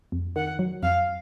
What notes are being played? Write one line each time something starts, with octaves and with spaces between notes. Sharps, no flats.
F2
D#3 F#5
F#3
F2 F5